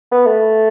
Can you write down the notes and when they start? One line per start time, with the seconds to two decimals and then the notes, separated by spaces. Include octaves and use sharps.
0.12 B3
0.26 A3